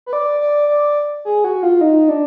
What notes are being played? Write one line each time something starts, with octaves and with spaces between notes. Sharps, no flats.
B4
D5
D5
D5
G#4
F#4
F4
D#4
D4